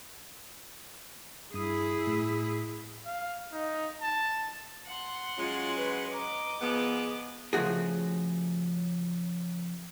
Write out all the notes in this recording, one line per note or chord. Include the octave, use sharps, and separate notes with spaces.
G2 E4 G#4 D#6
A2
F5
D#4
A5
F#5 C6
F#3 G#3 C#4 F4
B4
D#5 A#5 D6
F3 B3 G#4
C#3 F3 A3 F#4 G#4